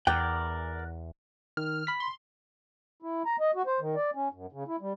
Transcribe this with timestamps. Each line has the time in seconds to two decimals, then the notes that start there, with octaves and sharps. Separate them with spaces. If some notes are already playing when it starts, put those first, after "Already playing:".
0.07 E2 A#4 D5 F#5 G5
1.57 D#3 F6
1.87 B5 B6
2.00 C6
3.02 E4
3.26 A#5
3.40 D#5
3.55 F#4
3.67 C5
3.80 D#3
3.96 D5
4.15 C#4
4.33 F#2
4.52 C#3
4.68 E4
4.81 G3